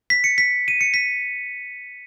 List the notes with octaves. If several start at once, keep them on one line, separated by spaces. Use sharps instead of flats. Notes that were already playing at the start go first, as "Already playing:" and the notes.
B6
C#7
B6
D#7
C#7
B6